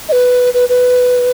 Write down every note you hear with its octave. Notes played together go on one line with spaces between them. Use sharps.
D#5
B4
B4
B4